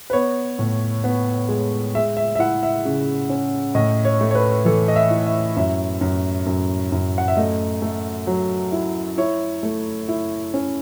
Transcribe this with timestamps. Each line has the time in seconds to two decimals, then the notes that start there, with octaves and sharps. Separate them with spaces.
0.10 B4
0.13 B3 C#5
0.59 A2
1.04 B3
1.49 G#3
1.95 G#3 E5
2.17 E5
2.35 E5
2.39 E4 F#5
2.63 E5
2.85 C#3
3.30 C#4
3.75 A2 D#5
4.05 C#5
4.21 A3
4.31 C#5
4.35 B4
4.65 E3 A4
4.88 D#5
4.96 E5
5.10 E4
5.26 E5
5.56 F#2 E5
6.01 F#2
6.46 F#2
6.92 F#2
7.18 F#5
7.28 E5
7.37 A3 D#5
7.82 A3
8.27 F#3
8.72 E4
9.18 E4 C#5
9.63 A3
10.09 E4
10.54 C#4